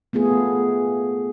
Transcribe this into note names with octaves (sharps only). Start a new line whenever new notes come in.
A3 B3 F4 G#4